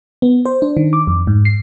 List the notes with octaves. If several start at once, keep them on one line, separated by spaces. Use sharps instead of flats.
B3
C5
D4
D#3
D6
F2
G#2
C7